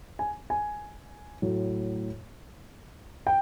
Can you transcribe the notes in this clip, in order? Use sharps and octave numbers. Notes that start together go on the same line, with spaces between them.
G#5
G#5
A2 F#3 A3
G5